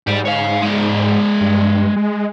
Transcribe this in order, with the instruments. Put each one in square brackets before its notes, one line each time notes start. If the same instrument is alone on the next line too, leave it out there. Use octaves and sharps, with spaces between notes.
[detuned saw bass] G#2 [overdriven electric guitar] G4 D5
[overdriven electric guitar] C#5 F5
G#3 D5
[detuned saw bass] G2
G#3